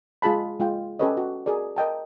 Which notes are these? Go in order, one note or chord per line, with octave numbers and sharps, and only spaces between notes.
G#3 F4 G#4 A5 B5
G#3 F4 G5
C#4 G4 A4 B4 C#5 D#5
F#4
F#4 G#4 A#4 D5
A#4 D#5 G5 A5